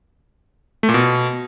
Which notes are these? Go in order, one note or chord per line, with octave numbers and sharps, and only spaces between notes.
A3
A#2
B2